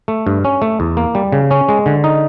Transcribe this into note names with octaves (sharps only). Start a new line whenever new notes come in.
A3
G2
C#4
A3
E2
A#3
G3
C#3
C#4
G#3
D3
D#4